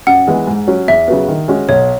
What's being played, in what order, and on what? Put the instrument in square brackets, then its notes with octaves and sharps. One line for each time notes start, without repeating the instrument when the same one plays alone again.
[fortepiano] F#2 [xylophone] F#5
[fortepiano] E3 G#3 B3
G#2
F#3 C#4
[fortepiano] E2 [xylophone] E5
[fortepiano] C#3 F#3 B3
D#3
G#3 C#4 F#4
[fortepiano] B1 [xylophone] C#5